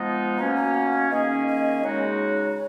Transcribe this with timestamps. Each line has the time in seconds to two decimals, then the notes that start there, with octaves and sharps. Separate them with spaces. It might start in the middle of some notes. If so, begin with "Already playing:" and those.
Already playing: F3 G#3 B3 D#4
0.38 B2 A#3 C#4 F#4 A#5
0.56 A#5
0.74 F#5
0.93 F5
1.11 D#3 A#3 C#4 G#4 D#5
1.47 D#5
1.84 C#3 G#3 D#4 F#4 C#5